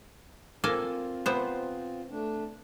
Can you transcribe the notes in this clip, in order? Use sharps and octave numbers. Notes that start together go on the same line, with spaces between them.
A#3 C4 F4 A4 G#5
C3 B3 C5
A3 D4